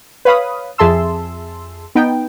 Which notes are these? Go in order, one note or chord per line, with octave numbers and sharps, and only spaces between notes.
B4 C#5 F5 B5 D#6
F2 G#4 E5 A5 C6 E6
B3 D#4 G5